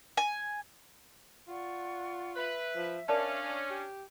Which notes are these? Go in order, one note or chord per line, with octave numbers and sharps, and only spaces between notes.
G#5
F4 D5 F#5 C#6
B4 E5
F3
C#4 D4 A#4 D5 F5 A5
G4